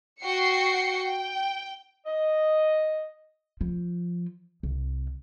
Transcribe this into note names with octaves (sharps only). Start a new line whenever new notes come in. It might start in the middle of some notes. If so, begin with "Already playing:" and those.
F#4 G5 C7 C#7
G5
D#5
F3
C2